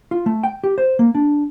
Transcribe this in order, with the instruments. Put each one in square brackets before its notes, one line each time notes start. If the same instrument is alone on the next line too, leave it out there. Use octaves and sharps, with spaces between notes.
[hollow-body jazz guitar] F4
A3
G5
G4
C5
A#3
D4